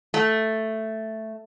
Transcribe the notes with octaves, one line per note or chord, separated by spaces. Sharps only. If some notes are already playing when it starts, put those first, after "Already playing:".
A3